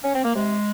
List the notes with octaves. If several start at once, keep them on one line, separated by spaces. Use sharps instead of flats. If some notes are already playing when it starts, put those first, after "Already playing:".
C#4
C4
A#3
C3 G#3